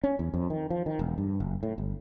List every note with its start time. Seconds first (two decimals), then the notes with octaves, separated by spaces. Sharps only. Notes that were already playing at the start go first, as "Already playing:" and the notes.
0.04 C#4
0.19 E2
0.34 F2
0.50 D#3
0.70 F3
0.86 D#3
0.99 E1
1.18 G2
1.40 F#1
1.63 A2
1.78 G1